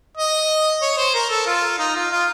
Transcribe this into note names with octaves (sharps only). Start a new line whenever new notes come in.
D#5
C#5
C5
A#4
A4
F4
D#4
F4
F4